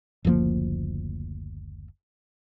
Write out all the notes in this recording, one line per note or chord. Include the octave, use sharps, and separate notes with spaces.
F#1 D2 F3 A#3